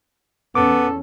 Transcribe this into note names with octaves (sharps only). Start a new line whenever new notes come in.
E2 B3 C#4 A4 D6